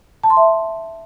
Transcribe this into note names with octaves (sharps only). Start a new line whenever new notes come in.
A5
C6
E5